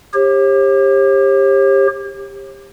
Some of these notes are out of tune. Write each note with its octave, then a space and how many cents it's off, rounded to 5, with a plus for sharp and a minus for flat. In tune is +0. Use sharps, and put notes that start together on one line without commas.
G4 +20 C#5 -45